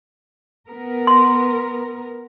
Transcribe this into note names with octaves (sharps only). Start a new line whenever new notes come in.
B3 A#4
C6